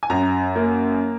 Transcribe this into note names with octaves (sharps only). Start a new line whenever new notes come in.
G#5
F#2 A#5
A#3